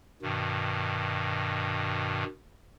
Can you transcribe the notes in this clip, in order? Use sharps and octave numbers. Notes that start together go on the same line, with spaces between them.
G2 B2 D#3